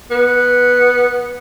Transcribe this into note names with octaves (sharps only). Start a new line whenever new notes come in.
B3